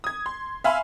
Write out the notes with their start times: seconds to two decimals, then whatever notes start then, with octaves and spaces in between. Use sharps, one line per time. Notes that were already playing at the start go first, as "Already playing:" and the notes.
0.04 D#6 G#6
0.26 C6
0.64 E5 F5 G#5 B5 C6